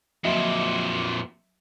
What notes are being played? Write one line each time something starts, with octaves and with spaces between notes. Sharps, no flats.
F2 A#2 F#3 D#5 E5